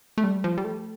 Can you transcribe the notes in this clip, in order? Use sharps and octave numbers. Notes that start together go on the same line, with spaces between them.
A3
G3
F3
G3
A3